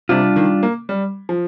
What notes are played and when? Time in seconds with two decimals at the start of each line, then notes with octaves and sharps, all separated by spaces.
0.09 C3 G3 D4 F4
0.36 D#3
0.63 A#3
0.89 G3
1.29 F3